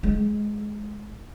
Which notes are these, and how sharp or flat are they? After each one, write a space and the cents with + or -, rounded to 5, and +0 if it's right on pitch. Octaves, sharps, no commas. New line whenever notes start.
G#3 +15